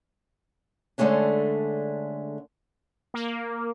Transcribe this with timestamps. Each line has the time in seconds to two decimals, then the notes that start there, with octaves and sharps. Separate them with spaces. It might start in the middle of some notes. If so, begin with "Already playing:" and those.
0.98 D3 G#3 A3 C#4 D4
3.14 A#3